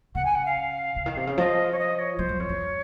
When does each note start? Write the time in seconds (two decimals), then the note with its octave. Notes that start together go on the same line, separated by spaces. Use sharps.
0.14 C#3 F#5
0.24 G#5
0.34 F#5
0.45 F5
0.96 C#3
1.06 D#3
1.17 C3
1.27 C#3
1.37 F3 D#5
1.71 C#5
1.78 D#5
1.98 C#5
2.18 F3 C5
2.29 F#2
2.39 F2 C#5
2.49 F2